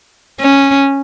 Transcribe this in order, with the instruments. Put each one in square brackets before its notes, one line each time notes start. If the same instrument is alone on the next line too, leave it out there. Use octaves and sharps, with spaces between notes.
[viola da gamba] C#4